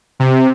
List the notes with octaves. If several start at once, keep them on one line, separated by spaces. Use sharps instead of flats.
C3